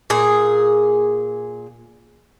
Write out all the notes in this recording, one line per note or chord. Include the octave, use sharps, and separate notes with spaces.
A#2 G#4